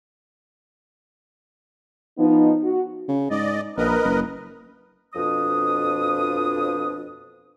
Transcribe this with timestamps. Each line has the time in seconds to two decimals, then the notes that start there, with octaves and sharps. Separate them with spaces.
2.18 F3 B3 D#4
2.62 F#4
3.08 C#3
3.30 G#2 D5 D#5
3.77 A#1 A#4 B4 D#5
4.04 F#1
5.14 F2 B2 F3 D4 D#6